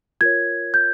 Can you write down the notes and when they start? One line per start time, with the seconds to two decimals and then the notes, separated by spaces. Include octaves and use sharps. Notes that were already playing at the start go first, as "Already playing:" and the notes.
0.21 F4 A#4 C#5 G#6
0.74 G6